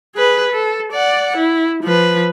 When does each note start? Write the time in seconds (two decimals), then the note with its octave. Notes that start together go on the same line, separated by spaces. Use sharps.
0.16 G#4 B4
0.52 A4
0.92 D5 F#5
1.37 E4
1.83 F3 B4